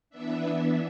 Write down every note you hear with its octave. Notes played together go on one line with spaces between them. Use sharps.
E3 B3 D4 E5